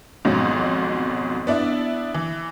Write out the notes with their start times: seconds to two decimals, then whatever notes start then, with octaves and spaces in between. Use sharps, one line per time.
0.25 G#1 F2 G#2 B2 F#3
1.47 B3 D4 E4
2.14 E3